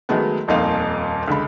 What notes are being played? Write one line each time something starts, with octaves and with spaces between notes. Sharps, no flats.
D#3 F#3 G#3 A3 B3
D#1 F2 A#2 D#4 F5
C#2 D3 B5